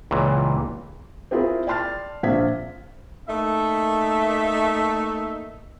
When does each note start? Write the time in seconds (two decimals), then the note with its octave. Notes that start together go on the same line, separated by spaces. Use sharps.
0.11 C#2 A#2 E3
1.31 C4 E4 F4 G#4 A#4 C5
1.67 D5 G5 A5 C6 F6 A6
2.23 A#1 C4 E5 F5 G#6 B6
3.29 A3 A#3 D#4 E5